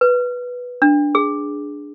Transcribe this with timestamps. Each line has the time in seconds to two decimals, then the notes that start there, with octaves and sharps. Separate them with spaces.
0.01 B4
0.82 D4
1.15 G#4